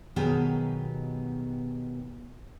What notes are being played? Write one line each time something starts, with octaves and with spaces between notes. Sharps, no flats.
B2 D#3 F#3 B3 G4 G#4